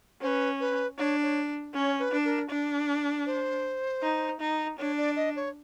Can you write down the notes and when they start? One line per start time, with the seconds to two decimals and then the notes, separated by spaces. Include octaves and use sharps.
0.22 C#4 C5
0.27 B4
0.60 B4
0.98 D4 C#5
1.23 C#5
1.74 C#4 C#5
1.99 B4
2.12 D4
2.25 A#4
2.50 D4
3.26 C5
4.03 D#4
4.40 D#4
4.79 D4 C#5
4.98 D5
5.16 D#5
5.36 C#5